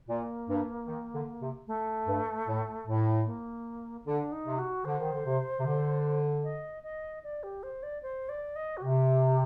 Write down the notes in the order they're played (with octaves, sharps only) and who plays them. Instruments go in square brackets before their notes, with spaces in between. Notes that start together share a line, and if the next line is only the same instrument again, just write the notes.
[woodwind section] A#2 [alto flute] A#3
[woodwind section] G2
D#3
D3
C3
[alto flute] A3
[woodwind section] G2
A2
A2
[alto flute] A#3
[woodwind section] D3 [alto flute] D4
[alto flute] D#4
[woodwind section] C3
[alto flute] F#4
[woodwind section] D3 [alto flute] C5
[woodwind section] D#3
D3
C3
C3
D3
[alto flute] D#5
D#5
D5
G4
C5
D5
C5
D5
D#5
F#4
[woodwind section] C3 [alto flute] G4